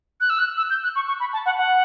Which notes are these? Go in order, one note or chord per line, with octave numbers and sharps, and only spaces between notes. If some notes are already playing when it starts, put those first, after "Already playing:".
F#6
E6
F#6
E6
G6
F#6
C#6
C#6
B5
A5
F#5
F#5